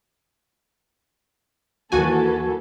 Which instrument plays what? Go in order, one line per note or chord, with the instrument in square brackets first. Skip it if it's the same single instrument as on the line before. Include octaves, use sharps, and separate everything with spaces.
[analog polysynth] D#2 F#4 G#5 [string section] E3 A#3 A4